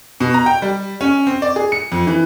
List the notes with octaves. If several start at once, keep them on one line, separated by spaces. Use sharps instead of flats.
B2
A#5
G5
G3
C#4
C4
D5
G#4
C#7
F2
E3